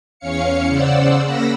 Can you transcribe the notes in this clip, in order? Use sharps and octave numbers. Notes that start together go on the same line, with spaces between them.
E2 C#4 C#5 F5 C#7
C#3 C5 D5 F#5 E6
C#3 A#3 F#5 B5 E6 A#6